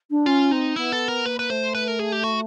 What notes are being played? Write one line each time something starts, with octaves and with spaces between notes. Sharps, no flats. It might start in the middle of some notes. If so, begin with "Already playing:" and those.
D4
C#4 F4
C4 D#4
B3 E4
A4
A#4
A#3 B4
B4
A3 C5
B4
A#4
G#4
G4
F#4